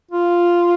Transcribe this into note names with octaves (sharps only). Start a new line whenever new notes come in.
F4